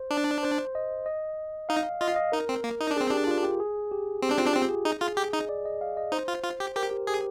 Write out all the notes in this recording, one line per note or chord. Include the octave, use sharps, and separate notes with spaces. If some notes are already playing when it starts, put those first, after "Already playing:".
Already playing: C5
D4
C5
D#5
D#5
D#4 F5
F4 D#5
F5
D#5
D#4 A#4
C4
A#3
D#4
D4
G#4
C4
D4 G4
F4
G4
G#4
G4
C4 G4
D4
C4 F4
D4
C4 G4
G#4
D#4 G#4
F4 G#4
G4 G#4
D#4 D#5
D5
D#5
F5
D#5
D#4 C5
F4
F4
G4
G4 A#4
G4
G4 G#4